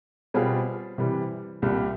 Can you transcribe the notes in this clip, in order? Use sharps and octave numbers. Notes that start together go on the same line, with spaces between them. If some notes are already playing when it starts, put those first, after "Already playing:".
B2 G3 C4 F4 G#4
C3 E3 G3
C2 A#2 G3